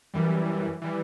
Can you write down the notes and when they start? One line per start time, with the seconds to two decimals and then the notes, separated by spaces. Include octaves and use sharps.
0.14 F#2 E3 G3
0.82 E3 G3